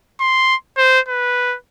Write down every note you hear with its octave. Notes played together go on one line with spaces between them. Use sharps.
C6
C5
B4